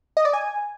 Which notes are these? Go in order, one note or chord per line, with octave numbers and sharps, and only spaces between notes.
D#5
D5
G#5